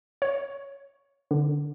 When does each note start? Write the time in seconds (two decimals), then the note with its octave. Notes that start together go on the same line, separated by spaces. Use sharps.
0.22 C#5
1.31 D3